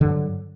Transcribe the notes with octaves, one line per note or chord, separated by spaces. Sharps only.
G2 D3 F#3